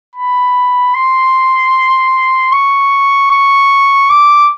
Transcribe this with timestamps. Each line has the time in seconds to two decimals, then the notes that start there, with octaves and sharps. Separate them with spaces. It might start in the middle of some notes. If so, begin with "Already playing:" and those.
0.15 B5
0.94 C6
2.52 C#6
3.31 C#6
4.10 D6